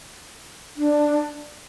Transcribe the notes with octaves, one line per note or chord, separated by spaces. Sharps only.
D4